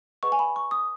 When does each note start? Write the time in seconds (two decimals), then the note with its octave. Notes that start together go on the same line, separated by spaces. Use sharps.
0.23 G#4 B4 D#5 F#5 C#6
0.32 G#5
0.39 B5
0.56 C#6
0.71 D#6